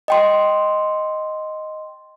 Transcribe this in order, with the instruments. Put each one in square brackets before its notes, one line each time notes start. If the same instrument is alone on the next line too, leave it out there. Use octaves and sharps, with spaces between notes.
[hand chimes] D#5 G5 C6